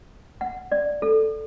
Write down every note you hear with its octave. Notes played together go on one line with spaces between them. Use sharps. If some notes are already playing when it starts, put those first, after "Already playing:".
F#5
D5
A4